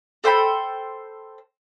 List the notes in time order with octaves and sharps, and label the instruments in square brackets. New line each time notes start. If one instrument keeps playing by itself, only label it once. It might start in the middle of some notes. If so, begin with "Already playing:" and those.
[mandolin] A4 C5 G5 B5